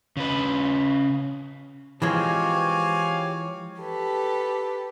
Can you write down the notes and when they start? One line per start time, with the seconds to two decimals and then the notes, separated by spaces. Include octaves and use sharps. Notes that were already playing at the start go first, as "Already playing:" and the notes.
0.17 C#3 B4
2.02 E3 F3 G#3 C4 G4 C#5 F5 G#5
3.81 G4 A4 B4